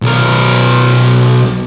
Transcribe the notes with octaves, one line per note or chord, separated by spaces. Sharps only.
B1 A#4